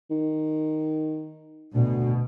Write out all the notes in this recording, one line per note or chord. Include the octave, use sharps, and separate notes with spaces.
D#3
D2 B2